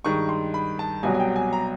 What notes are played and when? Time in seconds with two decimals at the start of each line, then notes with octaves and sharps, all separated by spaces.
0.05 G2 D#3 G#3 C#6
0.29 C6
0.54 B5
0.79 A5
1.03 C2 B2 F#3 G#5
1.14 G#5
1.20 G5
1.36 G#5
1.53 A#5